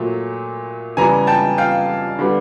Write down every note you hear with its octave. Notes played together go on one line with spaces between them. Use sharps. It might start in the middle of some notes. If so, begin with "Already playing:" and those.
Already playing: A#2 F#3 A3
C#3 E3 G3 B3 G#5 A#5
G5 A5
F5 G5
D3 G3 B3